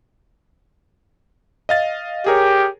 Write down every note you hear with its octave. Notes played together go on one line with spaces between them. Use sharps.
D#5 F5 A6
G4 G#4 A#4 C#5